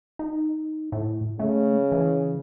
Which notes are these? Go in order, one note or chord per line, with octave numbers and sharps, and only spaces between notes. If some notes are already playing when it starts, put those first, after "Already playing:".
D#4
A2
C#3 A3
E3